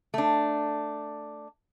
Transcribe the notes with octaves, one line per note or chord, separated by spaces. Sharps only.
A3 D4